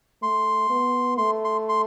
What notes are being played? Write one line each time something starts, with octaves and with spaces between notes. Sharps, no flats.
A3 C6
B3
A3 C6
C6
C6